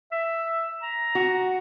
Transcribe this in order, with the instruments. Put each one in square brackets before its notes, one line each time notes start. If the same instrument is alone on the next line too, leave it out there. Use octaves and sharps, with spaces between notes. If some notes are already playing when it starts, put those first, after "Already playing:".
[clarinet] E5
A#5
[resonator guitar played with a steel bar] F#4